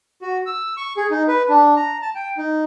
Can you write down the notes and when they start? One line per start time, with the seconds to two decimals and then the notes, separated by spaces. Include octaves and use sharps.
0.22 F#4
0.46 E6
0.77 C#6
0.97 G#4
1.11 D#4
1.28 B4
1.49 D4
1.77 A#5
2.02 A5
2.15 G5
2.37 D#4